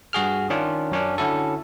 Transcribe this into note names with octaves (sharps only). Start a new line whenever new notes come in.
G2 F#4 G#4 F6
D#3 C#4 D4 F4
F#2 C#4 D4
D3 C#4 E4 F#4 A4